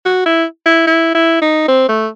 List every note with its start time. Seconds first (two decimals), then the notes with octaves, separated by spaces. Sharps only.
0.05 F#4
0.26 E4
0.66 E4
0.87 E4
1.14 E4
1.42 D#4
1.68 C4
1.89 A3